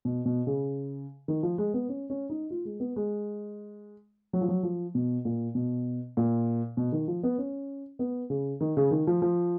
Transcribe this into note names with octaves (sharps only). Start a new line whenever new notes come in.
B2
B2
C#3
D#3
F3
G#3
B3
C#4
C#4
D#4
F4
G#3
B3
G#3
F#3
F3
F#3
F3
B2
A#2
B2
A#2
B2
D#3
F3
B3
C#4
B3
C#3
D#3
C#3
D#3
F3
F3